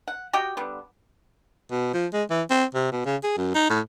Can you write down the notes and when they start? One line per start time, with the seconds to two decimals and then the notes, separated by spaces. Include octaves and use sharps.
0.08 F#5
0.33 F#4 G4 D#5 G5
0.57 D3 G3 B3
1.71 B2
1.94 F3
2.13 G#3
2.30 E3
2.50 C4
2.74 C3
2.92 B2
3.05 C#3
3.23 G#4
3.37 F#2
3.55 D#4
3.70 A2